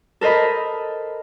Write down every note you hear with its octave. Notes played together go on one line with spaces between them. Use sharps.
A4 A#4 C5 D#5 B5